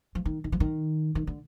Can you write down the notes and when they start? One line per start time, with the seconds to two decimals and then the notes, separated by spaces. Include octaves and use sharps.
0.15 F3
0.25 D#3
0.44 D#3
0.52 F3
0.60 D#3
1.15 D#3
1.27 D3